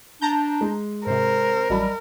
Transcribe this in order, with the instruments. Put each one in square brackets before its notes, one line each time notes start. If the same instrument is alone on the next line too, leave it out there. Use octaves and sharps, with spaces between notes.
[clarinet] D4 [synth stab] A5 A#5 G6
[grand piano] G#3
[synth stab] G#2 C3 [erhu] A#4 [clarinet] C5
[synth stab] A1 F#3 [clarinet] G3 [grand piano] D#5 A5 B5